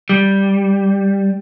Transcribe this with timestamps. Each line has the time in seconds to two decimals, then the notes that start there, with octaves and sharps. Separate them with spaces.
0.10 G3